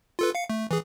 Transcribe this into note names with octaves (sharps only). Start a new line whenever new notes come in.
F4 A4 B4
F5 C#7
A3
E3 G#4